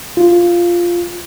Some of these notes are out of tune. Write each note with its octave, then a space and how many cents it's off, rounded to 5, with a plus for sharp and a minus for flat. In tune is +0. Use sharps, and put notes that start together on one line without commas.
F4 -5